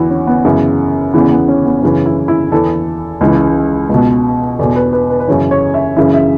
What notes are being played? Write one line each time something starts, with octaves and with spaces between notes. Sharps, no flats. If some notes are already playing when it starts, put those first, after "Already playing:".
Already playing: E2 E3 E4 F#4
C#4
B3
F#2 C#3 E3
E2 C#3 E3 B3
B3
C#4
B3
F#2 C#3 E3 C#4
E4
E4
E2 E3 A4
C#2 C#3 E3
C#2 B2
E2 B2 A4
B4
B4
B4
B4
F#2 C#3 E3 C#5
C#5
E5
F#2 C#3 E3 E5
E5